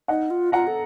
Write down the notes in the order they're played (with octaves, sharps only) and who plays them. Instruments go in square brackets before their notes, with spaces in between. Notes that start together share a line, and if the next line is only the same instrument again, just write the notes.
[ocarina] D#4 [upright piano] D#5 F#5
[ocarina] F4
[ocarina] F4 [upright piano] F#5 A#5
[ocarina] A4